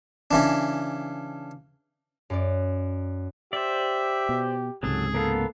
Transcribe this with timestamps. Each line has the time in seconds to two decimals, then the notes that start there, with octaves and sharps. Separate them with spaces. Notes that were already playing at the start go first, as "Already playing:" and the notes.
0.31 C#3 E3 D4
2.30 F#2 D5
3.53 G4 C5 D5 E5
4.29 B2
4.83 C#2 G#2 C3 F#3 G#4 A4
5.14 A#3 B3 A4 F5